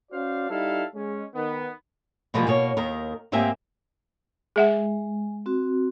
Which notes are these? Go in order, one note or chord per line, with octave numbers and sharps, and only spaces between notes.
C#4 F#4 C5 D5 F5
G3 D#4 E4 A4 F5
G#3 C#4
D#3 B3
B2 E3 F3 G3 G#3 A#3
B2 A#3 C#5
D#2 D#3 A#4
G#2 A#3 C4 G4 E5 G#5
G#3 G#4 E5 F#5
C4 F#4